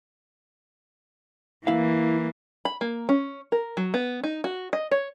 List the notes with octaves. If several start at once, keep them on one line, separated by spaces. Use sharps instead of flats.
E3 A#3 E4 F5
B5
A#3
C#4
A#4
F#3
B3
D#4
F#4
D#5
C#5